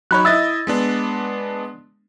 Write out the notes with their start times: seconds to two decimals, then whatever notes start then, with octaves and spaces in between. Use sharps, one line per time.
0.11 F#3 D#4 C#5 B5 F#6
0.25 E4 D#5 E5 E6 A6
0.67 G#3 B3 D4